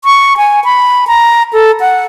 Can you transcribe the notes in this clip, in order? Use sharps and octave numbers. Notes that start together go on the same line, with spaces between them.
C#6
G#5
B5
A#5
A4
F#5